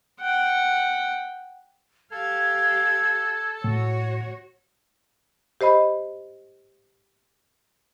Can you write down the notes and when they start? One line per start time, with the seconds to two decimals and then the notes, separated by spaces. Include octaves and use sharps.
0.21 F#5 G5
2.12 G4 A4 F5 G#6
3.64 A2 F#4 C#5
5.61 G4 C5 D#5 B5